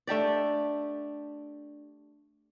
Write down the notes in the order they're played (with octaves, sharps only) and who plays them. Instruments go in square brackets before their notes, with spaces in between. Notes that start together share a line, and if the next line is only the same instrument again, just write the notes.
[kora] A3 D4 G4 D5